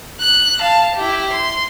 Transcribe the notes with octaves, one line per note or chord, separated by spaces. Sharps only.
F#6
F5 A5
E4 G4
C6